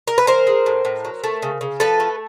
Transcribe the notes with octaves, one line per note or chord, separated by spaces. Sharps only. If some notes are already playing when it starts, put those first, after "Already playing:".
A#4
B4
E3 A#4 C5
G#3
A2
A2
F#3
A3
C#3
C#3
F3 A4 B4
A3